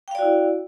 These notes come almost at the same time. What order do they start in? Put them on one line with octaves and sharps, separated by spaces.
G5 F5 D5 F#4 E4